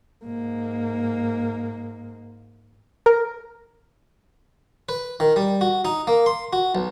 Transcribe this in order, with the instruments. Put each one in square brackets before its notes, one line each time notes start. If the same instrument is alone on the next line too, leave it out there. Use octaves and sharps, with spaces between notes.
[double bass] G#2 A#3
[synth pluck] A#4
[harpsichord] B4
D#3
G3
F#4
D#4
A#3
C6
F#4
B1